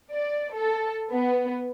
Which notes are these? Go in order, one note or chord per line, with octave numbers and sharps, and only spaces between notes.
D5
A4
B3